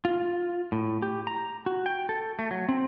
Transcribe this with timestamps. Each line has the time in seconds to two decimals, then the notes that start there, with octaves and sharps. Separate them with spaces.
0.05 F4
0.72 A2
1.02 G4
1.27 A#5
1.66 F#4
1.86 G5
2.09 A4
2.39 A3
2.51 F#3
2.69 C4